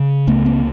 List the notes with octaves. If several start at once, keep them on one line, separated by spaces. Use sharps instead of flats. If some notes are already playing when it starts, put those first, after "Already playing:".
Already playing: C#3
C#2 A3 B3
A#3 C4